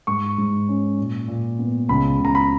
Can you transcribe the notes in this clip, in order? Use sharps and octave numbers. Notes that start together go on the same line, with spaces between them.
G#2 C#6
G#2
C#4
A#2
A#2
B3
C#2 B5
C#2
A#5
B5